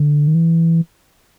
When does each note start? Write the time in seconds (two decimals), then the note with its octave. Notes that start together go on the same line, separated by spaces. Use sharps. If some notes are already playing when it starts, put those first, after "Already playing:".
Already playing: D3
0.27 D#3
0.35 E3